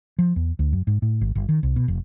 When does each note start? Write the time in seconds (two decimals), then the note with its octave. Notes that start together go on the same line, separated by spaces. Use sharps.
0.19 F3
0.36 E2
0.59 D2
0.73 F#2
0.87 G#2
1.02 A2
1.21 G#1
1.35 G1
1.49 D#3
1.63 C2
1.76 B2
1.88 F1